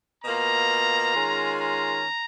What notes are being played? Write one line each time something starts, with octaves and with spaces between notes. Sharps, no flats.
B2 A#3 F4 A#5
D#3 G#3 C#4 F4
A#5